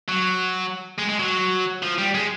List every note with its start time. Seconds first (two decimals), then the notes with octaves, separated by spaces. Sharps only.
0.09 F#3
0.98 G#3
1.09 G#3
1.19 F#3
1.82 F3
1.98 G3
2.14 G#3